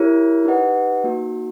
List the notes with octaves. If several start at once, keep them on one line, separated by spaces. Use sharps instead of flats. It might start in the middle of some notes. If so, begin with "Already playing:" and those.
Already playing: E4 G4 A#4 C#5
D#4 G4 B4 D#5 F#5
A#3 D#4 F#4